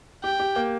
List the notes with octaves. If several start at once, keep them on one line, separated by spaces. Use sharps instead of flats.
G4 G5
G4
A#3